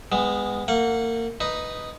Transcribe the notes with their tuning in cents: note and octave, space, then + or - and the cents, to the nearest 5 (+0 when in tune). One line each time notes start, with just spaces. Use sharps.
G#3 -20 B3 +10
A#3 -30 F#5 -25
D#4 +0 B4 +0